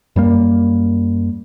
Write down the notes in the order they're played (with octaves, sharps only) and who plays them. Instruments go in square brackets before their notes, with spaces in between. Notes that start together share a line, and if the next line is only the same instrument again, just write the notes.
[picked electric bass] F#2 G3 A#3